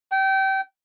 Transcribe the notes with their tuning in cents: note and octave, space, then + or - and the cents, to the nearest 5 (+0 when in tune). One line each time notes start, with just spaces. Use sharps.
G5 -25